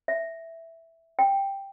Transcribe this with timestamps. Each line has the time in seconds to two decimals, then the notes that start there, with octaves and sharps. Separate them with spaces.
0.08 E5
1.19 G5